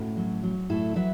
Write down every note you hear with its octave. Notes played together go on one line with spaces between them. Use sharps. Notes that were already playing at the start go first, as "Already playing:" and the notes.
Already playing: A2 C#4 F#4
F#3
F#3
A2 E4 A4
F#3 B4 E5